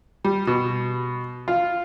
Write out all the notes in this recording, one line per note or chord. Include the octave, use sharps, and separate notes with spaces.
G3
B2
F4